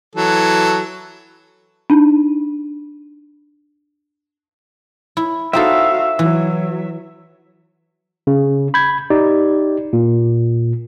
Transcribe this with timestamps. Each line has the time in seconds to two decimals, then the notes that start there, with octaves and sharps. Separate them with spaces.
0.16 E3 F#3 A4
1.90 D4 D#4
5.17 E4
5.53 C4 D#4 F#4 A4 E5 F5
6.19 E3 F#3
8.27 C#3
8.74 B5 G6 G#6
9.10 D#4 G4 D5
9.93 A#2